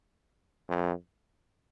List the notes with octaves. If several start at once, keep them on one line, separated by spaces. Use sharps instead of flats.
F2